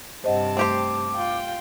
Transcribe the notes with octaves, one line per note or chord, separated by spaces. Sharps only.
G2 C3 C5 D#5 F#5 A5
A3 C4 G4 C5 D6
F4 G5